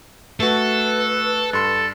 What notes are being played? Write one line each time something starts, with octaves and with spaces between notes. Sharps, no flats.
A3 F#4 A4 B4
G2 A4 C6